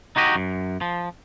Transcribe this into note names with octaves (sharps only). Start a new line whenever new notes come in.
D#4 F#4 G4 D#5
F#2
F3